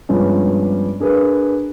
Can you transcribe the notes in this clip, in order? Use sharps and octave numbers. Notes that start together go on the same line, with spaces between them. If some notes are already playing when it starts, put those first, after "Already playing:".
G2 F3 G#3 B3 C#4
D4 G#4 A#4 B4